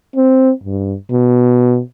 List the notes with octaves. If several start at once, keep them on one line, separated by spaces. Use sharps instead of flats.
C4
G2
B2